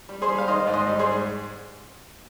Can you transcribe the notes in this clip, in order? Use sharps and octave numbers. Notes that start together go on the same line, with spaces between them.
G3
G#4 C5
G3
F5
D#3 C5 D#5
G#2
C5 D#5
G3
G#4 C5
G#2